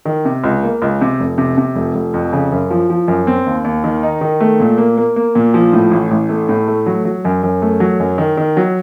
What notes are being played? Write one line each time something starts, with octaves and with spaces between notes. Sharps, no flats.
D#3
C3
C#2
A#3
C#2
C3
F1
C3
C3
F1
F1
F2
C#3
F#2
F3
F3
F#2
C4
D#2
D#2
D#3
D#4
D#3
A3
A#2
A#3
A#3
A#3
A#2
F3
A2
A1
A1
A3
A2
A3
F#3
F#3
F#2
F#2
A3
F#3
F#2
D#3
D#3
F#3